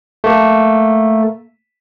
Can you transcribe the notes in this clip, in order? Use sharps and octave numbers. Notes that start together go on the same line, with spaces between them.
A3 A#3